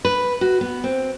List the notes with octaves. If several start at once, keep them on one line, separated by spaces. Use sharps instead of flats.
B4
F#4
B3
C4